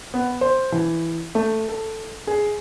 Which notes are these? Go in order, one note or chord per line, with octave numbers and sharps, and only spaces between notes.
B3
C5
E3
A3
A4
G#4